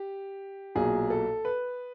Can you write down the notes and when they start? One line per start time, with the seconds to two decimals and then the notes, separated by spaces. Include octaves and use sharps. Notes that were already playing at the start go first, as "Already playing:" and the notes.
Already playing: G4
0.75 B1 A#2 F#3 G#4
1.10 A4
1.45 B4